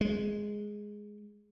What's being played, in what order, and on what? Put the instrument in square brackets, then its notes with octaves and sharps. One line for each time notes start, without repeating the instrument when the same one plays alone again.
[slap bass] G#3